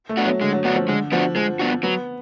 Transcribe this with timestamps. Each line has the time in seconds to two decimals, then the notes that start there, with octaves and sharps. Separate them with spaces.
0.09 A3
0.17 B3 D4 F#4
0.25 F#3
0.41 D3 G#3
0.52 F#3
0.64 F#3 B3 D4 F#4
0.76 F3
0.88 D3 G#3
1.12 F3 B3 D4 F#4
1.35 F3 G#3
1.59 B3 D4 F#4
1.83 F#3 B3